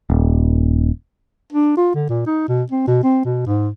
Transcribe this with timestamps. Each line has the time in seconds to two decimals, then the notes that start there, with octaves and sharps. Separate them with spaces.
0.10 D#1
1.52 D4
1.77 F4
1.94 D3
2.09 A#2
2.26 D#4
2.48 B2
2.71 C4
2.87 B2
3.03 C4
3.25 B2
3.46 G#2